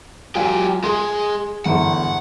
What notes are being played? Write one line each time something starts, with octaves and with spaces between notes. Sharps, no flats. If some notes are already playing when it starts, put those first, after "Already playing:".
F#3 F4 G4 F5 G#5
G#3 G#4 C6
G1 E2 F#5